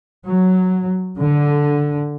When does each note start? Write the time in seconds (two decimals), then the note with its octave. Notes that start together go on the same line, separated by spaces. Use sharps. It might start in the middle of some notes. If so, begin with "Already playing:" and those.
0.25 F#3
1.21 D3